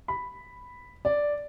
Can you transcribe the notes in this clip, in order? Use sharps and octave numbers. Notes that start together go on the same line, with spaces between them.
B5
D5